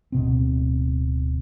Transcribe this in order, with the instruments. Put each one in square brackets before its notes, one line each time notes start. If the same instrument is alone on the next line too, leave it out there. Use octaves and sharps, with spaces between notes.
[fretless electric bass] D1 B2 C4